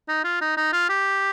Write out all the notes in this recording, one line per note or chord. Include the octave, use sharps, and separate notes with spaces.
D#4
F4
D#4
D#4
F4
G4